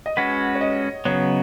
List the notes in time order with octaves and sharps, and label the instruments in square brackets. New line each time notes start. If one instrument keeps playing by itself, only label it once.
[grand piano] D#5
[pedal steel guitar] G#3 C#4 F#4 B4 [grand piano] F#5
[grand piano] C#5
D#5
[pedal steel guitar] C#3 F#3 B3 [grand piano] C#5